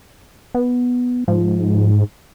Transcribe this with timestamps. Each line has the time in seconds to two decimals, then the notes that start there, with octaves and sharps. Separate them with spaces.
0.55 B3
1.28 G#2 F3